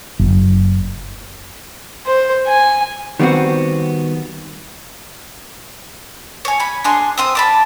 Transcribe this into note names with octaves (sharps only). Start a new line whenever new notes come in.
F#1
C5
G#5
D#3 G3 B3 C4 F#4
C#5 G#5
G#5 B5
D4 G#4 C6
C4 C5 D#6
D5 A5 B5